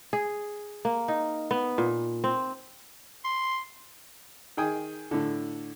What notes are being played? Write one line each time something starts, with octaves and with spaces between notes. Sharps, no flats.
G#4
A#3
D#4
B3
A#2
C4
C6
D#3 G#4 G5 G#5 D#6
A2 D3